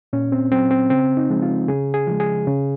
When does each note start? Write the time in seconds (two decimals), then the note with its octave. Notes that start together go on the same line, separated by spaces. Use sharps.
0.13 A#2 C#4
0.32 C4
0.52 F#3 C4
0.71 C4
0.90 C#3 C4
1.17 D#4
1.30 F3 G#3
1.42 F4
1.68 C#3 G#4
1.94 G#4
2.07 F3 G#3
2.20 G#4
2.47 C#3